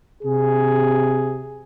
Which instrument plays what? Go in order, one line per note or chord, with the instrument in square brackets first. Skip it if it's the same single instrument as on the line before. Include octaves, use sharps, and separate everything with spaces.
[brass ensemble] C3 G#4